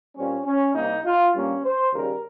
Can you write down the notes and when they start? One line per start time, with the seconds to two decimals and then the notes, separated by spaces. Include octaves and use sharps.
0.16 A#2 G3 C4 C#4
0.45 C#4
0.74 C2 C3 G3 A#3 D#4
1.05 F4
1.34 G2 G3 A#3 C#4
1.63 C5
1.93 D#2 C#3 G3 A#4